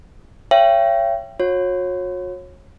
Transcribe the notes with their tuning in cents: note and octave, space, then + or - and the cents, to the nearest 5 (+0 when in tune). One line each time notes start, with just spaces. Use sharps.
C#5 +0 E5 +45 G5 +0
F#4 -40 C#5 -25